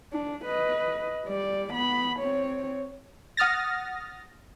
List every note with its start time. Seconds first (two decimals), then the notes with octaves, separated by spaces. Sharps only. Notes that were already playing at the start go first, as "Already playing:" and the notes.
0.13 D4
0.45 B4 D#5
1.26 G3 D5
1.72 B3 B5
2.20 C4 C#5
3.37 F#5 D#6 F6 A6 A#6